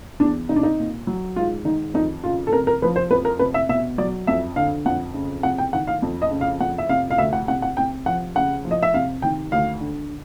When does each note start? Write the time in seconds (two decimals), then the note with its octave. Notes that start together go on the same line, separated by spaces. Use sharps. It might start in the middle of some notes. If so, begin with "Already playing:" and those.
0.20 E2 D4
0.49 C3 D#4
0.56 D4
0.63 D#4
0.78 A#2
1.07 F#3
1.36 G#2 F4
1.65 D#3 D#4
1.94 F2 D#4
2.24 C#3 F4
2.47 A4
2.53 C3 A#4
2.67 A#4
2.82 F3 B4
2.96 C5
3.11 F2 B4
3.25 A#4
3.39 C3 B4
3.54 E5
3.69 B2 E5
3.98 F#3 D5
4.27 F2 E5
4.56 D3 F5
4.86 F2 F#5
5.14 C#3
5.43 C3 F#5
5.58 G5
5.73 D#3 F#5
5.87 F5
6.02 F2
6.22 D#5
6.31 C#3
6.41 F5
6.60 F2 F#5
6.78 E5
6.89 C3 F5
7.11 F5
7.18 D2 E5
7.33 F#5
7.48 C3 F#5
7.62 F#5
7.77 C3 G5
8.06 F3 F#5
8.35 C#3 F#5
8.65 F3
8.71 D#5
8.83 E5
8.94 C3 F5
9.22 D#3 G5
9.52 D2 F5
9.81 D3